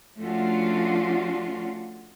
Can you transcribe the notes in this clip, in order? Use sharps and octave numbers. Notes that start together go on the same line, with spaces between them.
F3 A3 C#4 D4 F4 F#4